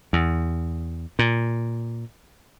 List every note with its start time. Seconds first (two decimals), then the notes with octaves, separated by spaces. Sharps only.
0.13 E2
1.19 A#2